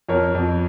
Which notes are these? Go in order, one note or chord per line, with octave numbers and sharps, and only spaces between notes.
F2 A#4 C#5
F2